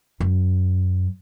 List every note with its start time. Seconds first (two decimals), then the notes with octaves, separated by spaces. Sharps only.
0.20 F#2